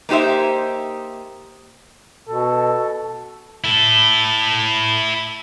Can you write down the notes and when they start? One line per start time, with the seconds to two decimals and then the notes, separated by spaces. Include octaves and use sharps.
0.09 A#3 D#4 G4 C5 E5
2.29 B2 A4
3.64 E4 A4